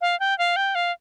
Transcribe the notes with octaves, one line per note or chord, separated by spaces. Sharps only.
F5
G5
F5
G5
F5